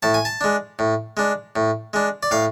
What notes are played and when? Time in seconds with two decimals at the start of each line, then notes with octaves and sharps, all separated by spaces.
0.03 A2 A5
0.14 G#5
0.25 A5
0.41 G#3 D4
0.79 A2
1.17 G#3 D4
1.56 A2
1.93 G#3 D4
2.23 D5
2.31 A2 F5